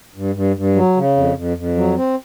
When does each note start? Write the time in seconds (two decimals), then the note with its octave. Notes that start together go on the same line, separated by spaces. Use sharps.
0.16 G2
0.35 G2
0.56 G2
0.76 F#3
0.96 C#3
1.17 F2
1.36 F2
1.57 F2
1.77 F#3
1.97 C4